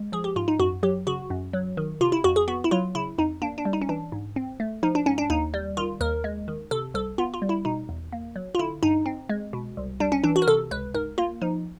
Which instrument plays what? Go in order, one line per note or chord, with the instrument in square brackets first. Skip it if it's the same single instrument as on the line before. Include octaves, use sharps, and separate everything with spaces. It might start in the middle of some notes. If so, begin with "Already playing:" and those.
Already playing: [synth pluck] G#3
F3 G#4
G4
G#2 F4
D#4
F#2 F#4
F#3 G4
C#3 F#4
F#2
F#3
D#3
C3 F4
E4
F2 F#4
G#4
B3 F#4
E4
F#3 F4
C#3 E4
F2 D#4
A#3 D4
D4
G3
D#4
C#4
E3 D4
G#2
C4
A3
F3 D#4
D4
G#2 C#4
D4
D#2 D#4
G3
D#3 F4
D#2 A#4
G#3
D#3
C3 A4
C2 A4
B3 F4
F4
G3
E4
B2 D#4
E2
A#3
F#3
F4
D3 E4
G2 D#4
C4
G#3
B2
C2
G3 D4
C#4
E3 D4
F#4
A#4
C3 A4
C#2 B4
G#2 A#4
A#3 F4
F3 D#4